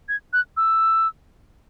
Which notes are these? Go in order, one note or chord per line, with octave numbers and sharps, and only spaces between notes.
G#6
F#6
E6